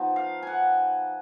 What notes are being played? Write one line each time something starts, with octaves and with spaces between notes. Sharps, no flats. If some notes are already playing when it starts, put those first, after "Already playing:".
Already playing: F3 B3 D#4
F5
F#5 G#5